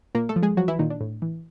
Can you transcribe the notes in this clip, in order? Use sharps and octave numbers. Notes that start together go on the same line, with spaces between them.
A#2 A#3 A#4
A3 A4
F3
G#3 G#4
F3 F#3 F#4
E3 E4
A#2 D#3 D#4
D4
A2
E3